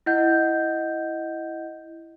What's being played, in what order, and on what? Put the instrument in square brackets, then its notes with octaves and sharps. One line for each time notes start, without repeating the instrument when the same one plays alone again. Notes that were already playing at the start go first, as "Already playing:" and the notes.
[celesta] E4 D#5 F#5 G6